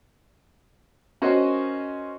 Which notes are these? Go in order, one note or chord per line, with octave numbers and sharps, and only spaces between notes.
C#4 F#4 A#4 C5 D#5